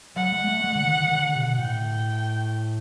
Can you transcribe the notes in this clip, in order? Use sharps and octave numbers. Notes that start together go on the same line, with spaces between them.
F#3 F#5
G#3
A3
G#3
D3
D#3
D#3
D3
B2
A2 G5